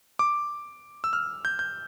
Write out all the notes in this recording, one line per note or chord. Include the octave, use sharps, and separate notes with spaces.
D6
E6
F6
G6
G6